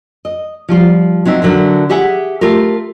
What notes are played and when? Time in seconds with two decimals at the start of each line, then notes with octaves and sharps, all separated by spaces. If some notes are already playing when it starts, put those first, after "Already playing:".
0.25 D#5
0.69 F3 G3 F4
1.25 F#3 C4 D#4 E5
1.42 D3 F#3 A#4 E5
1.90 G4 G#4 E5 F#5
2.41 A3 F4 G4 A#4